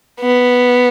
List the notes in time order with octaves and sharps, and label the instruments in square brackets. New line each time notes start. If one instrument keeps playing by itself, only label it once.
[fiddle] B3